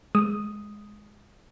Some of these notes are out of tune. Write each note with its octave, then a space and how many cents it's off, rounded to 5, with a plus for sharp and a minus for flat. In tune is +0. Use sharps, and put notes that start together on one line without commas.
G#3 +5 D#6 +0